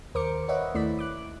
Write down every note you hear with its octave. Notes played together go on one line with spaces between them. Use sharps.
D#2 A#4 C5 D6 C#7
B4 C#5 D#5 E5 F#5
D#2 A3 E4 D5 B5 B6
D6 F#6